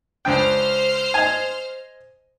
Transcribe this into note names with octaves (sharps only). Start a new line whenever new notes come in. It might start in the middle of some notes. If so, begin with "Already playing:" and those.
C#2 D4 C5 G5 F6
D#5 G#5